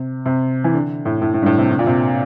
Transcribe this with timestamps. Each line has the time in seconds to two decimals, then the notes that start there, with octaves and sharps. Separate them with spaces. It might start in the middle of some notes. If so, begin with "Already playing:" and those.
Already playing: C3
0.26 C3
0.64 E3
0.74 D3
1.05 A2
1.22 A2
1.34 A2
1.42 G2
1.46 A2
1.58 C3
1.71 D3
1.79 A#2
1.86 C3